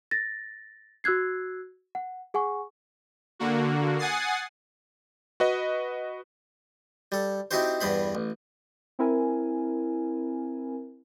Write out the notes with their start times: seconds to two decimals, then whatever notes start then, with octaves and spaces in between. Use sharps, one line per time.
0.11 A6 A#6
1.04 F#4 E6 F#6 G#6 C7
1.95 F#5
2.34 G#4 F#5 G#5 C#6
3.39 D3 A#3 F#4
3.98 F#5 G#5 D#6 A6 C7
5.40 F#4 B4 D#5
7.12 G3 A4
7.51 C4 D#4 E4 F#4 G4 C5
7.81 E2 G2 B3 C5 B5
8.15 A1
8.99 C4 E4 A#4 G#5